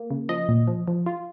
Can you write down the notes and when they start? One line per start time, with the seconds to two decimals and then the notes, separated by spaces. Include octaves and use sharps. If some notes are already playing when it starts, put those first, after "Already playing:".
Already playing: A#3
0.10 C#3
0.29 F3 D#5
0.49 A#2
0.68 F3
0.88 F3
1.06 F4